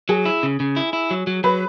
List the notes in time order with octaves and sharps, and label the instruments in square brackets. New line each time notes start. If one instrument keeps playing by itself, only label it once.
[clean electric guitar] F#3 [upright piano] G#4
[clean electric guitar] E4
C#3
C#3
E4
E4
F#3
F#3
[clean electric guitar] F#3 [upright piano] B4